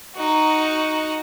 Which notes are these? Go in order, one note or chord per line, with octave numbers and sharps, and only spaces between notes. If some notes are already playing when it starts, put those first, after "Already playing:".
D#4 F#4